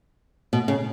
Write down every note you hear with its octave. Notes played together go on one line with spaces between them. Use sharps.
B2
C#3